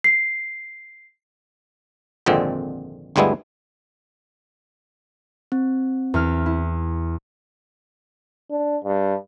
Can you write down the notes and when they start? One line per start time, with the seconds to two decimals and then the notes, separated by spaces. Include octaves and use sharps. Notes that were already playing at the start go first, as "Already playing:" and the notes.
0.04 C7
2.26 G#1 F2 A#2 D3 G#3 C4
3.16 G1 D2 G3 G#3 B3 E4
5.52 C4
6.14 E2 F6
6.46 E4
8.50 D4
8.84 G2